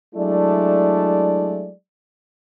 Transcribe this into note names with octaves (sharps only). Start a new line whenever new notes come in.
F#3 G#3 A3 D4 E4 D5